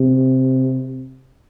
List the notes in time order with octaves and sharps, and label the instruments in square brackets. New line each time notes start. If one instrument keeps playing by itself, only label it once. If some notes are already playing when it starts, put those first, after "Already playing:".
Already playing: [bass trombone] C3